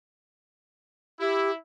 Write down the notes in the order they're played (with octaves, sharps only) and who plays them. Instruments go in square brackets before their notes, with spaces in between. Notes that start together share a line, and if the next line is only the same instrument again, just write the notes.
[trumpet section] E4 [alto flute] G4